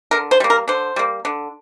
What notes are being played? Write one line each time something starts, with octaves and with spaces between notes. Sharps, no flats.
D3 A#4
C5
G3 A#3
A#4
D3 C5
G3 A#3
D3